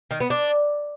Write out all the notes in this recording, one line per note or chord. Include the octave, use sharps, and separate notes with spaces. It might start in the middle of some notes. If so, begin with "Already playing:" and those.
D#3
B3
D4